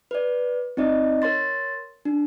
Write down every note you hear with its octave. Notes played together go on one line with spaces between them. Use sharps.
B4 D5
C4 D#4 D5 D#5
A#4 C#5 C6 A6
D4